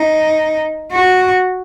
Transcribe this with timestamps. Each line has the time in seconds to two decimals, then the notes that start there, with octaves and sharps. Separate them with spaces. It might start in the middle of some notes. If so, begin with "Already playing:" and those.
Already playing: D#4
0.92 F#4